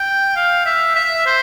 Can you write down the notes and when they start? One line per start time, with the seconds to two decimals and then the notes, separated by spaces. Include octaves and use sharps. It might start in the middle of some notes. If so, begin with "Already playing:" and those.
Already playing: G5
0.36 F5
0.66 E5
0.96 E5
1.27 C5